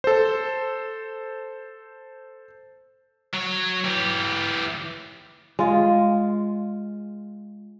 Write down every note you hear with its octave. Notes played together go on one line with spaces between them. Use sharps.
A4 C5
F#3 C#5
E3 G4
G#3 F4